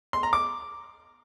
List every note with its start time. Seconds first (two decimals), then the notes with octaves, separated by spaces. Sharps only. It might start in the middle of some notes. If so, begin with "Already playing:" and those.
0.13 C6
0.23 A#5
0.33 D6